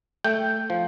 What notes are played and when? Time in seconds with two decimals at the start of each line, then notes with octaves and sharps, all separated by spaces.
0.24 A3 G5
0.70 F3